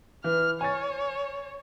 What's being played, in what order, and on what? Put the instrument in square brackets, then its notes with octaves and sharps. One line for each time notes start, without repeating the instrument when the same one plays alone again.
[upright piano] E3 [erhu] F6
[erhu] C#5 [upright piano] G#5 A6